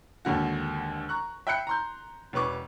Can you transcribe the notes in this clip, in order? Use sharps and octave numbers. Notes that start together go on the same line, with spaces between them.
D#2 G#2 D3 F#4
A#5 C#6 F#6
E5 G5 B5 F#6 C7 C#7
A#5 C6 G6
E1 C#4 B4 C#6 D6